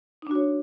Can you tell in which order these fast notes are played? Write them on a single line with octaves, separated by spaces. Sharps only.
D#4 D4 F#4 C#5